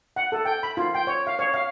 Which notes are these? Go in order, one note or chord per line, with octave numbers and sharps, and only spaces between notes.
F#5
A4
G5
B5
F4
G5
C#5
F5
C#5
F5